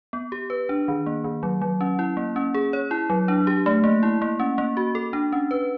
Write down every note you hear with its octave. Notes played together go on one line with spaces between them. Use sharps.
B3
G4
B4
D4
D#3
A#3
D#3
F#3
F#3
C#4
E4
A#3
C#4
G#4
C#5
E4
F#3
D4
G4
A3
A#3
E4
A#3
C#4
A#3
F#4
A4
D4
C#4
B4